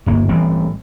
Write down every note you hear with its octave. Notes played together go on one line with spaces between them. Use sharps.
D1 G1 A#3
A1 E3 G3 C4